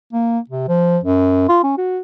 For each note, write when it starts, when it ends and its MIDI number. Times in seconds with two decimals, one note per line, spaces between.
0.13 0.39 58
0.50 0.68 48
0.68 0.98 53
1.04 1.45 42
1.49 1.59 65
1.63 1.73 61
1.78 2.00 66